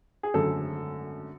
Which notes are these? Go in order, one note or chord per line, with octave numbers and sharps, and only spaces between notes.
G#4
G#1 F#2 D3 A3 A4